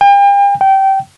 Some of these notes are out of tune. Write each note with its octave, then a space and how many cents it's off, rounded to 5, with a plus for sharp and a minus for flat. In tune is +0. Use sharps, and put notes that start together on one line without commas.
G5 +40
G5 -20